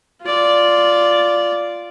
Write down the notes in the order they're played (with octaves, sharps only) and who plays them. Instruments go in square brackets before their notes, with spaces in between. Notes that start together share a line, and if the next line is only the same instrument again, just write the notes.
[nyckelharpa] F4 D5